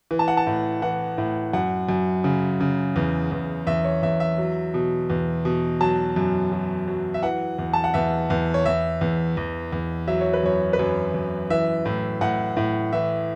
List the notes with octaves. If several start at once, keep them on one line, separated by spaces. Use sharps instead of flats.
E3
A5
F#5
A5
A2
E3 F#5
A2
F#2 F#5
F#2
C#3
C#3
E2
E2
E2 E5
C#5
E2 E5
E5
F#3
B2
E2
B2
F#3 A5
F#2
F#3
F#3
E5
E3 F#5
E2
A5
F#5
E2 E5
E2
C#5
E2 E5
E2
E2
E2
F#3 E5
C#5
B4
F#2 C#5
B4
F#2 C#5
F#2
E3 E5
A2
A2 F#5
A2
E3 E5